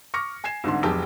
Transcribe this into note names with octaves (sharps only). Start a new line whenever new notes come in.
C#6 D6 F6 A#6 C#7
G#5 G#6 C7 E7
C2 G#2 D3 C6
F1 B1 G4 G#4 G5 A5